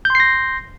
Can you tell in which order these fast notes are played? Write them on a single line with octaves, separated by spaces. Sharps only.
G6 C6 C7 A#6